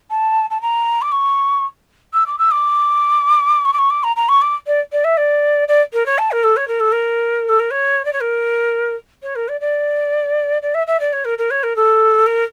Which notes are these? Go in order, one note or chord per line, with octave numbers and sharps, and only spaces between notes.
A5
A5
A#5
D6
C#6
E6
D6
E6
D6
C#6
D6
C#6
D6
A#5
A#5
C#6
D6
D5
D5
E5
D5
D5
A#4
C#5
A5
A#4
A4
C#5
A#4
A4
A#4
A4
A#4
C#5
D5
C#5
A#4
C#5
A#4
D5
D5
D5
E5
E5
D5
C#5
A#4
A#4
C#5
A#4
A4
A#4